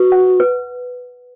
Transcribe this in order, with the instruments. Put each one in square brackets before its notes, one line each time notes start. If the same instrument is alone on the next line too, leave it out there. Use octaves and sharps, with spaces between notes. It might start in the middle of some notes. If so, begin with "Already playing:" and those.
Already playing: [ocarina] F#4 [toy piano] B4
[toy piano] F#5
B4